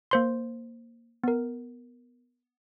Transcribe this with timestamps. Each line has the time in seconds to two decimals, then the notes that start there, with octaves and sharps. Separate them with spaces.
0.11 A#3 C5 C6
1.24 B3 A#4